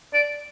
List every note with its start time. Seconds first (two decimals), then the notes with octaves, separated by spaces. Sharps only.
0.13 D5